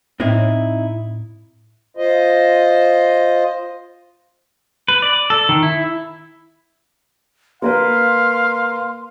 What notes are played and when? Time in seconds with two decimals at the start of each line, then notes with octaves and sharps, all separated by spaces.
0.20 A2 C4 D#4 E4
1.97 F4 C5 D#5
4.88 B4
5.02 D5
5.30 A4
5.49 D#3
5.63 E4
7.62 A#3 A#4 B4 F5 C6